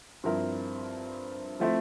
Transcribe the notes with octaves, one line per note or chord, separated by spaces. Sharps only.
G2 F3 C4 E4 A#4
F3 A3 C4 E4